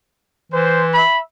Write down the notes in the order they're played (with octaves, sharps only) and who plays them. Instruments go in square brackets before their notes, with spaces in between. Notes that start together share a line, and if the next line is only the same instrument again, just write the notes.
[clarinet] E3 [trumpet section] C5
[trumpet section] E5 B5